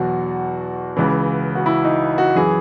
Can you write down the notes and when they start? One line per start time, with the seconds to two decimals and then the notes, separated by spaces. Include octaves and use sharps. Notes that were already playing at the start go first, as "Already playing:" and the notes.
Already playing: E2 B2 F#3 F#4
0.97 C#2 C#3 E3
1.55 F#4
1.66 E4
1.84 D#4
2.18 F#4
2.35 F#2 E3 G#4